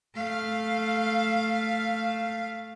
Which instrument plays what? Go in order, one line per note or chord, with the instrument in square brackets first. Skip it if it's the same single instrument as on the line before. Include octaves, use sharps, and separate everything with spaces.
[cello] A3 F5